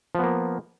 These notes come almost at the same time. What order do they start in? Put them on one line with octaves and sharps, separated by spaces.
F3 B3 A#3